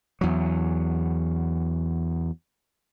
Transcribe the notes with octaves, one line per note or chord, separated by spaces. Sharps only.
E2 F#3